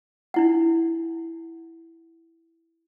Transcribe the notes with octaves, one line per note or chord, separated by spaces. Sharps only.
D4 E4 F#5